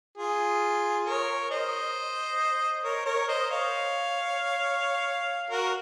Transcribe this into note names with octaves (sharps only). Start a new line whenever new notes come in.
F4 G#4
A#4 C#5
C5 D#5
A#4 C#5
A#4 C#5
C5 D#5
C#5 F5
F#4 A#4